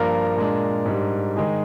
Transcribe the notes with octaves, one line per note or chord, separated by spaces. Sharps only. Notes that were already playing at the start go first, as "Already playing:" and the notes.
Already playing: G2 F3 A#3 D4 A#4
A#2 G#3 D4
G#2 G3 D4
D#3 G#3 D#4 G#4